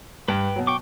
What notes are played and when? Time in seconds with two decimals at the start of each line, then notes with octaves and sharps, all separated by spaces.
0.28 G2 B4 G5
0.56 B2 F#3
0.67 G5 C#6 D6